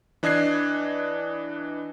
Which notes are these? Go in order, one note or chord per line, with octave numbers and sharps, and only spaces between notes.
E3 D4 D#5 F#6 G#6 C7